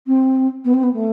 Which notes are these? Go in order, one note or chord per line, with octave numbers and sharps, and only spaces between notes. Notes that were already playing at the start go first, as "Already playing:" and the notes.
C4
B3
C4
B3
A3